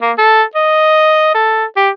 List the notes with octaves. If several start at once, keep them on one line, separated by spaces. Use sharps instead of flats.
A#3
A4
D#5
A4
G4